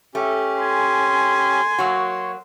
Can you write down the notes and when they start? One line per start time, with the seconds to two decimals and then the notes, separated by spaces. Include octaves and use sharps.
0.15 A3 C#4 G4
0.61 G#5 C6
1.78 F#3 A#3 F#4 C#5